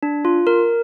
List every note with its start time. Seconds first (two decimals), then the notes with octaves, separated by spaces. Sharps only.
0.03 D4
0.25 F4
0.47 A#4